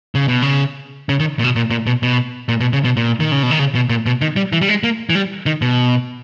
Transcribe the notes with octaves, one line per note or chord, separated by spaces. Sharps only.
C#3
B2
C#3
C#3
D#3
A#2
B2
A#2
A#2
B2
B2
A#2
B2
C#3
B2
A#2
D#3
C#3
B2
D#3
C#3
B2
A#2
B2
D#3
G3
E3
G3
G#3
A#3
E3
G3
D#3
B2